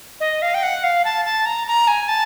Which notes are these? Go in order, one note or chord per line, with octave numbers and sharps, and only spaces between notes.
D#5
F5
G5
F#5
F5
A5
A5
A#5
A#5
G#5
A5